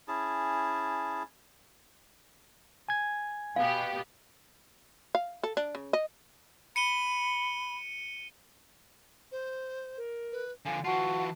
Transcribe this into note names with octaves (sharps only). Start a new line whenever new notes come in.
C#4 E4 G#4 A5
G#5 G#6
B2 B3 G4 F5
F5
A4
D4
C#3
D#5
B5 C#7 D#7 G7
C5
A#4
B4
D3 F3 F5 G#5
E3 F4 F#4 F#5 A5